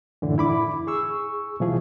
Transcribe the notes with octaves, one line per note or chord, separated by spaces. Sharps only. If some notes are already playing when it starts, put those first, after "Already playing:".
F#2 A2 D3 E3
E4 B5 D6
G#4 C#6 E6
B2 E3 F3 G#4